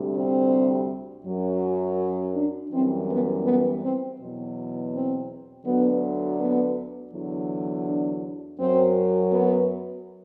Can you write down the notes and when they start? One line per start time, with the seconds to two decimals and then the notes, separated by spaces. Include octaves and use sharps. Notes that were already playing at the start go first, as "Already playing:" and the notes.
Already playing: D2 C3 G3
0.16 C4
1.26 F#2 F#3
2.35 D4
2.71 F#2 E3 G3 C4
3.09 B3
3.45 B3
3.82 C4
4.19 E2 B2 F#3
4.93 C4
5.66 D2 D3 F#3 B3
6.39 B3
7.13 E2 D3 F#3
7.87 D4
8.59 F#2 F#3 C4
9.33 B3